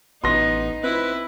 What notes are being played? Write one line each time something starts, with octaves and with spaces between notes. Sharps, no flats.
A1 B3 D#4 C6 A#6
C4 E4 B4